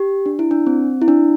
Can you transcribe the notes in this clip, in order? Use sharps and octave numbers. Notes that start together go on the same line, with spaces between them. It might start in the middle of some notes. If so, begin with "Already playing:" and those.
Already playing: G4
D4
E4
D4
C4
E4
D4